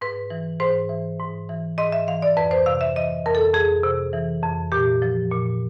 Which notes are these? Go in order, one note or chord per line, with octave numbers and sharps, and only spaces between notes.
G#2 B4
E3
G#2 C5
E3
G#2
E3
G#2 D#5
E5
E3 F5
D5
F2 B4
C5
C3 F5
E5
E3 D#5
F2 A#4
A4
F2 G#4
C3
E3
F2
A#2 G4
F3
A#2